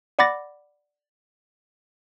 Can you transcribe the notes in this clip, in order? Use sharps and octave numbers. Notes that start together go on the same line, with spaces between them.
D5 F#5 B5 D6 A6 A#6